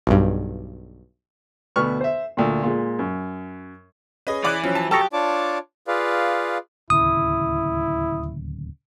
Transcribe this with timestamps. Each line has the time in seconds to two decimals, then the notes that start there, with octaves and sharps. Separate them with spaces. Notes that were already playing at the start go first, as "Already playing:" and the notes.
0.07 B1 G2
1.76 D2 B2 B4 C#6 F6
2.01 C5 E5
2.37 D2 A#2
2.63 A#2 G#3
2.99 F#2
4.27 C#4 G#4 B4 D#5
4.44 E3 D5 D6 F#6
4.63 F3 F#3 C#4
4.75 A5
4.91 F#3 G4 A4 A5 A#5 C#6 D#6
5.13 D4 F4 C#5 D5 A5 D6
5.87 F4 G#4 B4 D5 F5
6.90 D1 D#2 C#3 E4 D#6